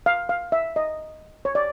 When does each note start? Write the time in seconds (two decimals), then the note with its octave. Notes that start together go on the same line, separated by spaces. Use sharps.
0.06 F5
0.29 F5
0.52 E5
0.76 D#5
1.45 C#5
1.55 D5